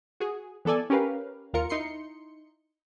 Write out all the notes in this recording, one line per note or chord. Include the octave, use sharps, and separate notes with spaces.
F#4 G#4
E3 B3 A4 D5 G#5
C#4 G4 A#4 B4 F5
D#2 F4 A#4 C#7
D#4 E4 C6 C#7